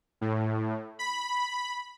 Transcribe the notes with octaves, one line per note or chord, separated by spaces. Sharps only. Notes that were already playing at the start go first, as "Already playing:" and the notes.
A2
B5